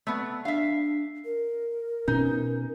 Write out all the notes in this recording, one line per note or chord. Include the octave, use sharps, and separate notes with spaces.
A3 B3
D4 E5 F5
A#4
B2 C#4 D#4